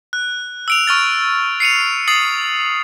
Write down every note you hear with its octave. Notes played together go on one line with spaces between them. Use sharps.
F#6
E6 D7 F7
C#6 F6 A6
C7 C#7 D#7 F7
D#6 A6 C7 F#7